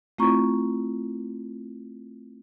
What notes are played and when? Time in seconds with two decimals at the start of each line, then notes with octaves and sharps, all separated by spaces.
0.18 A3 C4 E4 F4 A#5 C#6